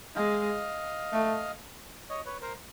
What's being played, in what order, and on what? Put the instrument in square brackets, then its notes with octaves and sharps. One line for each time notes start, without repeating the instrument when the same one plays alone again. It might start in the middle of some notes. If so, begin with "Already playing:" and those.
[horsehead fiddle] G#3 [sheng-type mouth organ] D#5 F5
[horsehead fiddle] A3
[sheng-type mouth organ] C#5 D#5
B4 C#5
A#4 C5